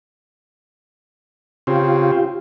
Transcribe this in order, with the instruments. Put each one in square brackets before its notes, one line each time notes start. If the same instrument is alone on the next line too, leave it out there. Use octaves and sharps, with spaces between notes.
[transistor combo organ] C#3 C4 [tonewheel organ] F4 G4